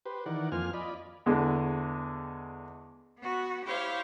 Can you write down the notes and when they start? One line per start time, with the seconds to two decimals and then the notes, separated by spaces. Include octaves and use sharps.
0.06 G4 B4 C5
0.26 D#3 E3 A#4 D5 F#5
0.52 F2 A#3 F4 C5 G#5 F6
0.73 F4 D5 D#5 B5
1.26 E2 D3 G#3
3.18 B3 F#4
3.64 E4 G4 C5 C#5 F5